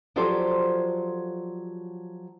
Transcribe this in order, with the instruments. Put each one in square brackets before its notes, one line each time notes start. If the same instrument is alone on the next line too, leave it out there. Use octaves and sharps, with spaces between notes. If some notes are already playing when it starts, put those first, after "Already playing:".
[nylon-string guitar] F3 F#3 G4 A4 C5 D5